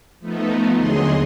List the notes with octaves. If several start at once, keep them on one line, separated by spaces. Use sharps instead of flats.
F3 A3 B3 D#4
D#2 D3 F#3 G#4 D#5 C6